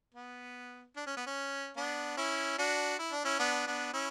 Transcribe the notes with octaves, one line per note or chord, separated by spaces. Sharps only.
B3
D4
C#4
B3
C#4
B3 D4
C#4 E4
D4 F#4
E4
D4
C#4 E4
B3 D4
B3 D4
C#4 E4